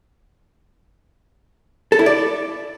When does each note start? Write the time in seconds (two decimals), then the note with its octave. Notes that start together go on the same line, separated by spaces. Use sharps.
1.92 A4
1.99 E4
2.06 D5